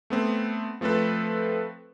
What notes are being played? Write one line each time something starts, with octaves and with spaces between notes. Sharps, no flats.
A3 B3 C4
F3 A3 C4 A4 B4